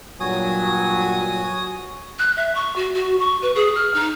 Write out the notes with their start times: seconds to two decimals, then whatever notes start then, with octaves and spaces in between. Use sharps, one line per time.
0.20 G2 A#2 F#3 F#4 G#5 D#6
2.19 F#6
2.37 E5
2.55 C#6
2.76 F#4
2.94 F#4
3.19 C#6
3.42 B4
3.55 G#4
3.75 F6
3.94 D#4